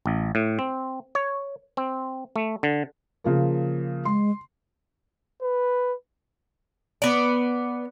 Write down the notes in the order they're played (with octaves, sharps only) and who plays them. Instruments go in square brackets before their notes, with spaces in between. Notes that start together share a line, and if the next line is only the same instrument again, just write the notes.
[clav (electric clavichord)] A1
A2
C4
C#5
C4
A3
D3
[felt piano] C#3 F3 A#3
[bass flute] G#3 [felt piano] C6
[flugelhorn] B4
[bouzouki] B3 D5